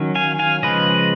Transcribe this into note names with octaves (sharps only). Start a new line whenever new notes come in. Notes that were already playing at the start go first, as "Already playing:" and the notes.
Already playing: D#3 F#3 C#4
F5 G#5
F5 G#5
C#3 F3 G#3 B4 D#5